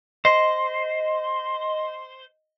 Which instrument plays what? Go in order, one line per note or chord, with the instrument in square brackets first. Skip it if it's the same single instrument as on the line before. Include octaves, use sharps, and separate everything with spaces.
[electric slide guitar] C5 [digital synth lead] D#5